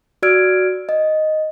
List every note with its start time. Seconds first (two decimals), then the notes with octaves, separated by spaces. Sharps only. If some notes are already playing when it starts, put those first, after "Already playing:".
0.22 F#4 D5 E6 F6 G#6 D7
0.89 D#5